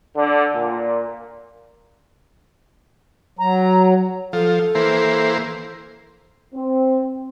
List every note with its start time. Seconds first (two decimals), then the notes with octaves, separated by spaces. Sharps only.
0.16 D3
0.55 A#2
3.39 F#3 A#5
4.33 F3 A4
4.75 E3 A#3 C5
6.54 C4